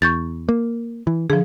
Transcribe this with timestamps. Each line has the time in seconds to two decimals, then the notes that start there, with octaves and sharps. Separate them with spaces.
0.02 E2 C#6 G6 A6
0.49 A#3
1.07 E3
1.30 D3 F3 G#4